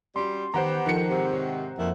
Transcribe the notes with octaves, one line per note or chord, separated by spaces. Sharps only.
G3 C#4 F#4 C6
D#3 B3 G4 C5 F#5 A#5
D#3 F3 A4 C#7
G#2 C3
C#5 G5
F2 A#2 D#3 E4